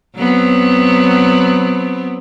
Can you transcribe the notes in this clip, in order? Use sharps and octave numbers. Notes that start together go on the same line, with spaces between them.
F#3 B3 C4